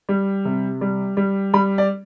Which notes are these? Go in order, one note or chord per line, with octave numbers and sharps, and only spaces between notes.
G3
C3
G3
G3
G3 B5
D5